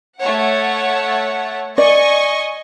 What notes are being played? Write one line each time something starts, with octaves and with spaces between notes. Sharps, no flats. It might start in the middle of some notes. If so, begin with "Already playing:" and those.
A3 C#5 F#5
D5 D#5 G#5 C#6